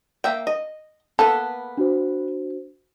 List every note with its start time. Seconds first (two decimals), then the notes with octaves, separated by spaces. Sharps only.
0.24 A#3 E5 G5
0.47 D#5
1.19 A#3 B3 A4 B4
1.77 D4 F#4 C5